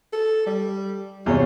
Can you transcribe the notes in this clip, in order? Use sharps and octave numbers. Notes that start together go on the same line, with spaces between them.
A4
G3
E2 C3 F4 C#5